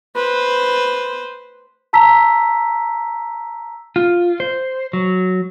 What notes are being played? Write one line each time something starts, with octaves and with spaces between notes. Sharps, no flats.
B4 C5
A5 A#5 E6 B6
F4
C5
F#3